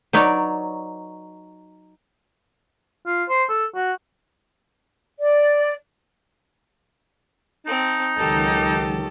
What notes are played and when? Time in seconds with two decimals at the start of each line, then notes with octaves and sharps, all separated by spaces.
0.13 F#3 D#4 B4 C#5 D5
3.06 F4
3.29 C5
3.49 A4
3.75 F#4
5.19 D5
7.66 C4 D#4 A5
8.18 C#2 D#3 F#3 G4 A4 D#5